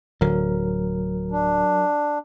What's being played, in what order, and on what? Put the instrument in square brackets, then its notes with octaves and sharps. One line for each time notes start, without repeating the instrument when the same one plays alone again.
[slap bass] D1 D3 [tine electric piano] F#3 A#4
[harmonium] D4